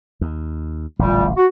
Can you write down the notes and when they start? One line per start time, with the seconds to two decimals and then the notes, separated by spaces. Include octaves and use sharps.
0.21 D#2
0.99 D1 A1 A#2 G3
1.37 F#4